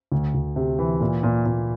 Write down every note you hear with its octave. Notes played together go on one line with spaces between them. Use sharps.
D2
D2
C3
E3
A#2
A#2
A#2